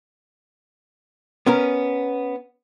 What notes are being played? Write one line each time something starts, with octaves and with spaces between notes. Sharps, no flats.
B3 C#4 A#4